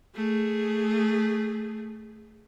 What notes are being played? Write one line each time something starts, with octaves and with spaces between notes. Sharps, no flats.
A3 G#4